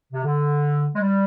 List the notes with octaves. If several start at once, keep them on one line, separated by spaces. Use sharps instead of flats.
C3
D3
G#3
G3